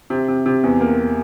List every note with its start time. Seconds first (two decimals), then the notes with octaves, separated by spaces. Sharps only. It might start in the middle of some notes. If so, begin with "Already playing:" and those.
0.10 C3
0.28 C3
0.46 C3
0.64 E2
0.81 A#3